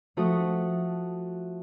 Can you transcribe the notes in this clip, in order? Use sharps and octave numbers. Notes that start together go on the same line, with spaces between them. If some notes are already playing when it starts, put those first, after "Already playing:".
F3 A3 F#4 D#6